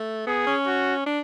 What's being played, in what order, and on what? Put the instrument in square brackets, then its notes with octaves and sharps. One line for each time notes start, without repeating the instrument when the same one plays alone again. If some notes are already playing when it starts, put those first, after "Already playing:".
Already playing: [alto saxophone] A3
[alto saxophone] B3 [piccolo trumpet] G#4
[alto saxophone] C#4
[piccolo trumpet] F#4
[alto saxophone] D4